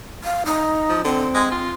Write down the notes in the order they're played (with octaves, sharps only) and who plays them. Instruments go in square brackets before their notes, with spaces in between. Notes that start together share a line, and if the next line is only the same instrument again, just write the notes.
[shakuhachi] F5
D#4
[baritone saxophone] F3
[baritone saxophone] D3 [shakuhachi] C4
[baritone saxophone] G#3
F4